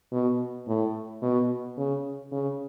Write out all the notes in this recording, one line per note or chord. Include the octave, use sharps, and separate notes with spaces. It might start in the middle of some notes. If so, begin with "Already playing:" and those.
B2
A2
B2
C#3
C#3